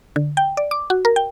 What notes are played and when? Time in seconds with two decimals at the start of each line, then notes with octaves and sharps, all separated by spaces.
0.16 D3
0.37 G5
0.57 D5
0.71 D6
0.90 F#4
1.05 A#4
1.16 G5